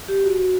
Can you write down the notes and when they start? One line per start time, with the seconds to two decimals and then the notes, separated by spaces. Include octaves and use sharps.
0.08 G4
0.24 F#4
0.38 F#4